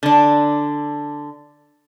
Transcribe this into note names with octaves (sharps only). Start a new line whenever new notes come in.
D3 D4